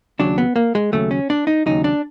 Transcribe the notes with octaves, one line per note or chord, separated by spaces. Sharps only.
D#2 C#3 F#3 D4
B3
A#3
G#3
D#2 C#3 F#3 A3
C#4
D4
D#4
D#2 C#3 F#3 D#4
D4